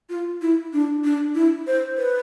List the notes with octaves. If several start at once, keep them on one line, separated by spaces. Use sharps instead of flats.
F4
E4
D4
D4
E4
C5
B4